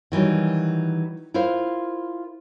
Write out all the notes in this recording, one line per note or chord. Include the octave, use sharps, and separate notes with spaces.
D#3 E3 F#3 G3
E4 F4 A#4 C5 F5